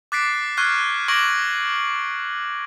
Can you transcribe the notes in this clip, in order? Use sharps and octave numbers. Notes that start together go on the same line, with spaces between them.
D6 F#6 A6 B6 C7 D7
C#6 F6 F#6 G#6 C7
C#6 D6 G#6 A#6 D7 F#7